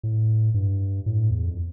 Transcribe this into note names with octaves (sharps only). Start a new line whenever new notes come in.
A2
G2
A2
E2
F2